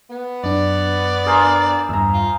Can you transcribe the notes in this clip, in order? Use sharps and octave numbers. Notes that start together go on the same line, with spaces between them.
B3
F#2 D4 D5
G#4 A#4 C5
E2 G2 E5 A#5
F4